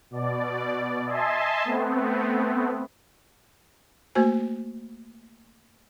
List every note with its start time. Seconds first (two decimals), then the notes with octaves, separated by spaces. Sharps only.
0.10 B2 D5
1.05 D#5 E5 G#5 A5 C6
1.64 A3 B3 C4
4.15 A3 A#3 F#4 C5 G#5